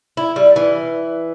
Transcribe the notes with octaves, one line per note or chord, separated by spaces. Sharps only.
E4
G3
E3